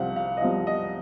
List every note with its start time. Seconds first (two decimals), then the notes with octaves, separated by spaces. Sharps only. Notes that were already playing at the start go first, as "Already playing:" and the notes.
Already playing: C2 C3 F3 F5 F#5
0.16 F5
0.37 D#5
0.42 C2 C3 F3 F5
0.67 D#5